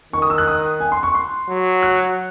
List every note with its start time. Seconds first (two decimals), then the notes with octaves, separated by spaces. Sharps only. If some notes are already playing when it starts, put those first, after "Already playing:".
0.13 D#3 C#6
0.22 D#6
0.30 E6
0.38 F#6
0.48 D#6
0.80 G#5
0.92 C6
1.03 C#6
1.14 C6
1.49 F#3
1.83 F#6